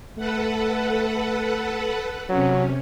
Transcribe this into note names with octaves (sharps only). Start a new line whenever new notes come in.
A3 A4 B4 F#5
C3 F#3 C#4